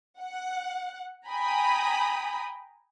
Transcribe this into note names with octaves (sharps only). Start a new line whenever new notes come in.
F#5
G5 G#5 A#5 B5 D#6